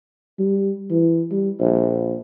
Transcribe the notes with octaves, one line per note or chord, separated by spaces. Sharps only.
G3
E3
G3
A#1